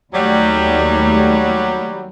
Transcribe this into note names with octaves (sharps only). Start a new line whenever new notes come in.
D#2 F#3 G3 A3